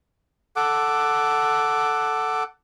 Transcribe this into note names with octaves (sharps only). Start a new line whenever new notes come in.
A4 F#5 D6